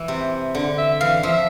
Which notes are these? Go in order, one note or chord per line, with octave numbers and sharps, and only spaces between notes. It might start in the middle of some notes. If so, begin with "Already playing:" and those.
Already playing: E3
C3
D3
E5
E3 F5
F3 E5